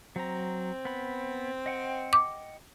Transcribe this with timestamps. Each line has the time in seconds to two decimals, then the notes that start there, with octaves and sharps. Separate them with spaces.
0.16 F#3 C4 A#5
0.85 B3 B5
1.66 D#5 F#5 G5
2.13 D6